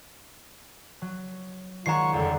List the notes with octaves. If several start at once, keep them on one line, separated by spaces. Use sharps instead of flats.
F#3
D#3 G#3 F4 C#5 F#5 A#5 C#6 C7
F#1 F2 D3 G3